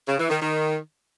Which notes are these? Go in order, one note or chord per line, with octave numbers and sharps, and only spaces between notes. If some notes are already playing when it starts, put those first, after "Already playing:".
C#3
E3
D#3
D#3